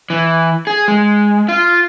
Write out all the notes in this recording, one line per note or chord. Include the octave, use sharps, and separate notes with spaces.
E3
G#4
G#3
F4